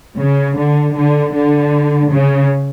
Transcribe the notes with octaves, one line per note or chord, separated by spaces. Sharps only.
C#3
D3
D3
D3
C#3